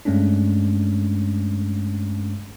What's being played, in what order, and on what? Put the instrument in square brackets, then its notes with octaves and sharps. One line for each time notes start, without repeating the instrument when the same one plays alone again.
[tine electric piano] G2 G#3 A3 C#4 D4